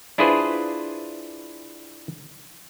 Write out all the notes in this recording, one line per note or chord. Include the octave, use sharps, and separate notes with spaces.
D4 E4 F4 G#4 B4 C5